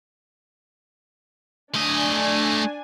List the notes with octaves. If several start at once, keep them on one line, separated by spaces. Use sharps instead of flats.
A3 D4 D#5 G#5